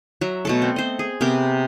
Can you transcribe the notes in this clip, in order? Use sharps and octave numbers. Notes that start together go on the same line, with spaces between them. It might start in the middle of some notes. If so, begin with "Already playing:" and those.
F#3 E5 A#5
B2 A3 A4
C4
C5 D#5
G#4
C3 B3 A#4 D6